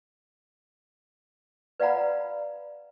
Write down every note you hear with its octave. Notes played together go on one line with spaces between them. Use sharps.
B4 D5 F5 F#5 A#5 B5